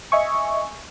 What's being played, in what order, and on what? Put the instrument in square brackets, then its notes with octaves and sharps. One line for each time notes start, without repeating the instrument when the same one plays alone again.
[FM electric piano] D#5 E5 G#5 C#6